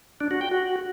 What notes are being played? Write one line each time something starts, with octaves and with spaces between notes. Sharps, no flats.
D4
F#4
G5
F#4